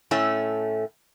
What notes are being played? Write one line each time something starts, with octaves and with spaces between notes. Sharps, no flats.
A2 A3 C#4 E5